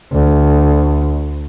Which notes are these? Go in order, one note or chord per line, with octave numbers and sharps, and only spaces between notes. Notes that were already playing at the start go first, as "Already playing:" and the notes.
D2